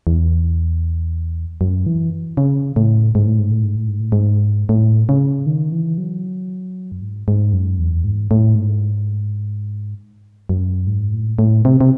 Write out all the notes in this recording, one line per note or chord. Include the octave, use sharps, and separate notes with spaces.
E2
F#2
E3
C#3
A2
G#2
A2
G#2
A2
G#2
A2
G#2
A2
G#2
A2
C#3
D#3
E3
F#3
F#2
G#2
G#2
F#2
E2
G#2
A2
G#2
F#2
G#2
A2
A2
C3
C3